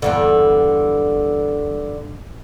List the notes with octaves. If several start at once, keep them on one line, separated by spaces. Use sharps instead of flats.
E2 G2 D3